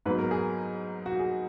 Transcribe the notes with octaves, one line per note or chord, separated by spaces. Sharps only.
G#2 F#3 B3 B4
A#4
G#4
F#4
G#4